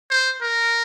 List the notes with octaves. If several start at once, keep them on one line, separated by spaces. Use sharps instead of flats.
C5
A#4